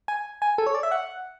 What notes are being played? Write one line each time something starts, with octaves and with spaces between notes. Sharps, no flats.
G#5
G#5
A4
C#5
D5
E5
F#5